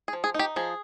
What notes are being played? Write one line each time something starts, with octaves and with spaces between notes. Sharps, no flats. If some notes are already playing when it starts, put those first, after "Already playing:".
G#4
F3
G#4
D#4 G4
F3 G#4